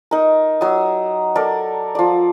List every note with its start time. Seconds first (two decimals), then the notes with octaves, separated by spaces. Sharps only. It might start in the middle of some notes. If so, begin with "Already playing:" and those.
0.11 D#4 A#4
0.61 F#3 D#6
1.35 A4 A#4 D5
1.95 F3 D5